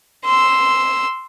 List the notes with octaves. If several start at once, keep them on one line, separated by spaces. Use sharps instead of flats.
C6 E6